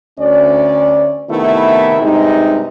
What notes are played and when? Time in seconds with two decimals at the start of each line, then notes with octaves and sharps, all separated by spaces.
0.19 D2 C#4 D5
1.30 C3 D#3 A3 B3 E4
2.02 G2 C3 G#3 D#4